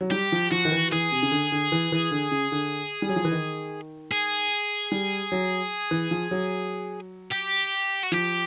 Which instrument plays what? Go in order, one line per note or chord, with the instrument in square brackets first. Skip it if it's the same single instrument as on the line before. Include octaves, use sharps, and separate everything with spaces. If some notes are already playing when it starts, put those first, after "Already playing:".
[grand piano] F#3
[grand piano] G3 [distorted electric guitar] G4
[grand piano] F3
[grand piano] F3 [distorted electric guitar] F#4
[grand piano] D#3
E3
[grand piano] E3 [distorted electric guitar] G#4
[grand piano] C3
C#3
D3
D3
E3
E3
D3
C#3
D3
G3
F#3
F3
E3
D#3
[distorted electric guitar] G#4
[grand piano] G3
F#3
E3
F3
F#3
[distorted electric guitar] G4
F#4
[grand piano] F3 [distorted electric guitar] G4